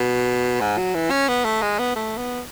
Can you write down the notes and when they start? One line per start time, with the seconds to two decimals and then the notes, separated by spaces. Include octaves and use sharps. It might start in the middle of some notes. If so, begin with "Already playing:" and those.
Already playing: B2
0.61 G#2
0.78 F#3
0.94 E3
1.10 C#4
1.28 B3
1.45 A3
1.62 G#3
1.79 B3
1.96 A3
2.17 B3